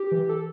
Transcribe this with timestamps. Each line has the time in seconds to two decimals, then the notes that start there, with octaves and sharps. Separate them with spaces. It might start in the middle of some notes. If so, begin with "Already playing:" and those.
Already playing: G4
0.11 E3
0.29 A4